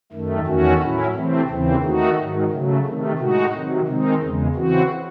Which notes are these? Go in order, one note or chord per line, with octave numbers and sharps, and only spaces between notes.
F#2 D#3 A3
E2 D#3 A3 C#4 F#4
A2 F#3 C#4 E4
C3 E3 A3 C4
D#2 C#3 E3 C4
D#3 A3 D#4 F#4
G#2 D#3 F#3
C#3 F#3 A3
C3 D#3 A3
A2 G#3 D#4 F#4
C3 D#3 F#3
D#3 G#3 C4 D#4
E2 C#3 G#3
C#3 E3 C4 F#4